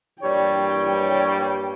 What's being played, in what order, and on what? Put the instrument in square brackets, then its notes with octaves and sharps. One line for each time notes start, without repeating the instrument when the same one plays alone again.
[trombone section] G2 A#2 G3 [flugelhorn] C#5 [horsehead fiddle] G5